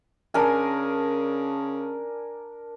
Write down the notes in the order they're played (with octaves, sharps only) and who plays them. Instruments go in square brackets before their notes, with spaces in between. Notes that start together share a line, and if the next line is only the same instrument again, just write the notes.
[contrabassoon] C#3 [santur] D4 A#4 G#5